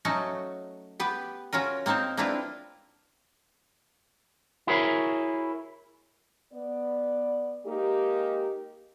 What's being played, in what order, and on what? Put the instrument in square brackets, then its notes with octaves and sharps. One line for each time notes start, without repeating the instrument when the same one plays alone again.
[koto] F#3 A3 C#4 D#4 F#4 A4
B3 G4 B4
C#4 F4 F#4 A#4
A#3 C4 D#4 A#4 C5
A#3 C4 D4 E4 F4 B4
[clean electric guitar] E4 F#4 G#4 A#4 C#5
[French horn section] B3 D5
G#3 A#3 D#4 G4